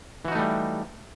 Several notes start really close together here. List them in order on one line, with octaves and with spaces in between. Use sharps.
E3 F#4 D#4 A3 G3